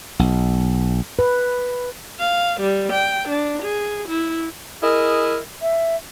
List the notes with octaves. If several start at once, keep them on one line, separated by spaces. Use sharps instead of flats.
B1
B4
F5
G3
G5
D4
G#4
E4
E4 G#4 A#4 D#5
E5